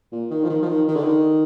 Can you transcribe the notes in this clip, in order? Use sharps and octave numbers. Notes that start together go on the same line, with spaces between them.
A#2
D#3
F3
D#3
F3
D#3
D#3
D3
D#3